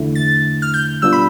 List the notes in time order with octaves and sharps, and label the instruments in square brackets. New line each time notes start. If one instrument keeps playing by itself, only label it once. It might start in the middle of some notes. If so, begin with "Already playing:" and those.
Already playing: [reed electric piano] E2 D3 A3 E4
[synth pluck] A6
F6
G6
[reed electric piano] B2 G3 B3 D4 F4 [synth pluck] E6
[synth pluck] B5